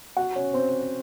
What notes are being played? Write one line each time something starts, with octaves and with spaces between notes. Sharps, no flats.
F#4 F#5
C#4 C#5
C4 C5